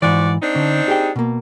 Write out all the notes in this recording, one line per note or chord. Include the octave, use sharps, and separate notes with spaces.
G#2 E3 F3 F#4 D5
C4 D4 D#4
D3 C#4
G4 G#4 G5
B2 A#3